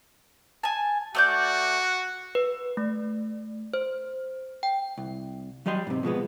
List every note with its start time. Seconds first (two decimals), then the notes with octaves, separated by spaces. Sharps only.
0.63 G#5 A5
1.15 A3 F#4 D5 G6
2.35 B4
2.77 A3
3.74 C5
4.63 G5
4.98 C2
5.66 F#3 G3 D#5 G5 C6
5.87 G#2 C3
6.03 B2 F3 G#3 B3